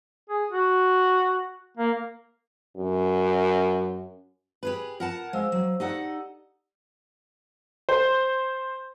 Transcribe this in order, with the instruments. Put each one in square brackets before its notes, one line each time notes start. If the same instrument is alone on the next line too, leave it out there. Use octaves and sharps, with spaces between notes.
[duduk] G#4
F#4
A#3
[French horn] F#2
[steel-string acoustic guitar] G4 G#4 B4
[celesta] F4 [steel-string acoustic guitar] A#4 F#5 A5
[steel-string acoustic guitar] G#3 [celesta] C5 F5 E6
[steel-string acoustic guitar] F#3
[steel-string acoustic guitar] D#4 A4 F#5 [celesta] G4 D5
[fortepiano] C5